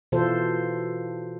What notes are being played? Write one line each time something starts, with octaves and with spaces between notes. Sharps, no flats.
B2 E3 F4 A4 C5